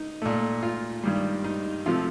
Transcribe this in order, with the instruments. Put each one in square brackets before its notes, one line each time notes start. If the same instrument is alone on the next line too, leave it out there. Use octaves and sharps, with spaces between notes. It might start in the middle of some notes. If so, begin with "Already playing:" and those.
Already playing: [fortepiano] D#4
A#2 A3
F4
G2 D#3 G3
D#4
C3 F3 A3 F4